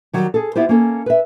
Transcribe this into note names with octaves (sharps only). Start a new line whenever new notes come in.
D#3 F#3 G3
G#4 A4
B3 E4 F4 G4 C5
A#3 C#4 A4
B4 E5